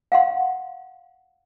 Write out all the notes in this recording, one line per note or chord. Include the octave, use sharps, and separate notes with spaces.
F5 F#5 C6